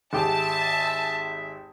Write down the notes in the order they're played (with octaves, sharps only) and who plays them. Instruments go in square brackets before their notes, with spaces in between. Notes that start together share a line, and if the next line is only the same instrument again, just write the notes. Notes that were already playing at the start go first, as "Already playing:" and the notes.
[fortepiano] G#1 G4 G#4 [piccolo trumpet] E5 [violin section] A5